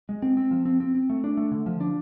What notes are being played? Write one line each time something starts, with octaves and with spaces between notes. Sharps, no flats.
G#3
C4
C4
F3
C4
C4
C4
A3
D4
A3
D3
F3
D4